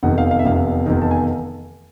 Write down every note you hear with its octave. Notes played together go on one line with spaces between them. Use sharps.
F1 E2 C3 D#3 F#5
F5
F5
E5
F1 E2 C3 D#3 F5
F1 E2 C3 D#3
A5
G#5